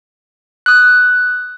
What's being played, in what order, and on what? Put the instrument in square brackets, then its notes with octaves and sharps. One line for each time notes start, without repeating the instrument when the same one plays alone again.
[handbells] D#6 F#6